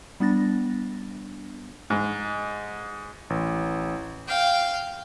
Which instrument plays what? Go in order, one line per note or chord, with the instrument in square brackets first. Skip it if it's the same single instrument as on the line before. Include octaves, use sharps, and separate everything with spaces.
[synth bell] G3 B3 D4 A6 A#6
[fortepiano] G#2
[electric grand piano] A1
[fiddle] F5 G5